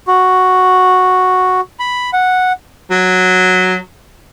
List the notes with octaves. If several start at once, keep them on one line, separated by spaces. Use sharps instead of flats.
F#4
B5
F#5
F#3